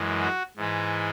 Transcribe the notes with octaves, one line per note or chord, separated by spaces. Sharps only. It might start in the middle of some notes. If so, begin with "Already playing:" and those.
Already playing: F#2 E3 G#3
F#4
G#2 E3 G#3